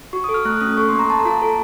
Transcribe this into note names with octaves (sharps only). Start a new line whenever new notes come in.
F#4 C#6
D#6
A4
F6
A3 F#6
C#4 D#6
A4 C#6
C6
A#3
A#5
A#3 A5
A#5
F4 A5
A4